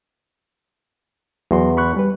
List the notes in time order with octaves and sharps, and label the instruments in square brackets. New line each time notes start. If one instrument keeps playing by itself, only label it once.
[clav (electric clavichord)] E2 [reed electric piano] F#3 F#4 C6
[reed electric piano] B5 C#6 F#6
G3 B4